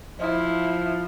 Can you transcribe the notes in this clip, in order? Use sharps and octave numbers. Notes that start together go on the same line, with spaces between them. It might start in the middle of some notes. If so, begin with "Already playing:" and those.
F3 E4